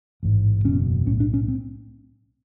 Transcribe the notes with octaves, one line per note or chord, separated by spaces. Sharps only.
A1 G#2
F#1 E2 B2 C#4
B1 A2 C#4
D4
C#4
C4